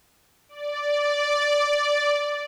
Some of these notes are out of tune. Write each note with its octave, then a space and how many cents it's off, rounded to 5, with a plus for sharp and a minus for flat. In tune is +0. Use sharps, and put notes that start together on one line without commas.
D5 -5